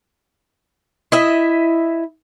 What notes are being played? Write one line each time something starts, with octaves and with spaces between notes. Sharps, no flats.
E4 D#5 E5